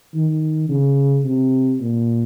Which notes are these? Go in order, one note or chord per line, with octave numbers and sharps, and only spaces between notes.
D#3
C#3
C3
A#2